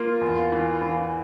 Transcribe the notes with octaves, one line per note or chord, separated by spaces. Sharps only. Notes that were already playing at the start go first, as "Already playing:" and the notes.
Already playing: A#3 F4
E2
E3
E3